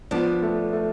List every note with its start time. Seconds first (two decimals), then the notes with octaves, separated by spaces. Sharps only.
0.11 F3 B3 D4
0.42 A3
0.73 A3